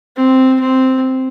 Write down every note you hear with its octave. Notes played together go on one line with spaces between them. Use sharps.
C4
C4